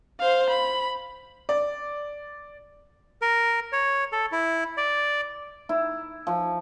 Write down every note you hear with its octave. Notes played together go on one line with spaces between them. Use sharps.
C5 F5
B5
D5
A#4
C#5
A4
E4
D5
E4
F3